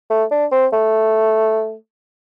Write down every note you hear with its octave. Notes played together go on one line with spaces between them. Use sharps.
A3
D4
C4
A3